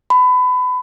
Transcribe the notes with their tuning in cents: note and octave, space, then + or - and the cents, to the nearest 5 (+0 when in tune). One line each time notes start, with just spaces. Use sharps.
B5 +25